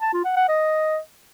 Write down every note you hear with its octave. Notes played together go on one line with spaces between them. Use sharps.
A5
F4
F#5
F#5
D#5